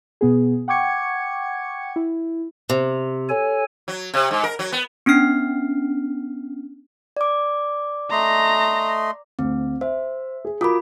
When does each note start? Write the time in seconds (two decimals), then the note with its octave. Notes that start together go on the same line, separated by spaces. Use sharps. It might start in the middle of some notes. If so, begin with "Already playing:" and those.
0.21 B2 B3 G#4
0.68 F#5 G5 C#6 D6 G#6 C#7
1.96 E4
2.70 C3
3.29 A4 C#5 G#5
3.88 F#3
4.14 C3
4.31 G#2
4.44 A#4
4.59 F#3
4.72 B3
5.06 B3 C#4 D4 F6 C7
7.17 D5 D6
8.11 A3 D#5 A#5 C6
9.39 D2 C4
9.81 C5 E5
10.45 G#4
10.61 F4 F#4 A#4 B5 D6 D#6